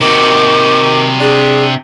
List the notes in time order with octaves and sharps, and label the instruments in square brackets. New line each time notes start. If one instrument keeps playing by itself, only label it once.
[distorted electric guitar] C3 F#4 [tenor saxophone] D#3 [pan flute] D6
[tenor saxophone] D4 [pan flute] G#4